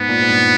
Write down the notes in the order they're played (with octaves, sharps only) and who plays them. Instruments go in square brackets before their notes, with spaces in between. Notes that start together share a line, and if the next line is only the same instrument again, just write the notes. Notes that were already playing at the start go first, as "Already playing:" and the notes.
Already playing: [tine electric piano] G#2 [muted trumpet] B3
[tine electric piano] A#2
G#2
G2